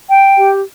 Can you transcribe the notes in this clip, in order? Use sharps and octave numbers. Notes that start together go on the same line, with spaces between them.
G5
G4